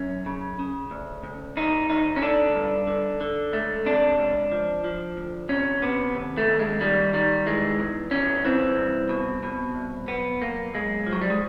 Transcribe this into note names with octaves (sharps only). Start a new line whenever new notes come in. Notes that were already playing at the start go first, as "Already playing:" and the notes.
Already playing: F#2 C#4
C#3
C#3
D2
D2
D2 D#4
D2 D#4
C#4
D3 D4
G2
D3
D3
C#2 A3
C3 D4
C#2
F3
F3
D2
C3 C#4
C3 B3
D#2
A3
D#2
G#3
D#3 G3
D#3 G3
E3 G#3
E2
E2 C#4
E3 C4
C2
B2
B2
C2
B1 B3
B1 A#3
B1 G#3
F3
F#3
G3
G#3